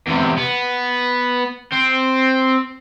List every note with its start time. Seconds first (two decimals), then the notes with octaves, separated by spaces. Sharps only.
0.07 E2 C3
0.38 B3
1.72 C4